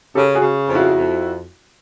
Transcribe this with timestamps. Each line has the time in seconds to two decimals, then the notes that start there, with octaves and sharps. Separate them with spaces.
0.15 C#3 G4 A4
0.35 F#4 G#4
0.42 C#3
0.68 F2
0.74 E4 F#4
0.94 F2